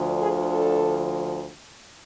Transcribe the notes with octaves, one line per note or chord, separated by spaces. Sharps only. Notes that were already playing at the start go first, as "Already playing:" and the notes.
Already playing: D2 D3 F3
G#4
A4